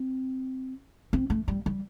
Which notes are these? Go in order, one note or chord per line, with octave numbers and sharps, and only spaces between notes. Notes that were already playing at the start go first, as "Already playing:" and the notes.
Already playing: C4
C4
A3
G3
G3